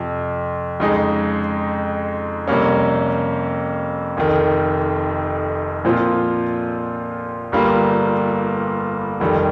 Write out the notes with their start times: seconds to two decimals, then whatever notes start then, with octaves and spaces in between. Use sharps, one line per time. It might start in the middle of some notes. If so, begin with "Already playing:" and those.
Already playing: F2 C3 F3
0.80 F2 C#3 G#3 D#4 G#4
2.48 F2 C3 G3 A#3 C#4
4.17 F1 F2 D#3
5.85 A#2 F3 C4 F4
7.52 G1 G2 G3 A#3 F4
9.20 F1 F2 D#3 G3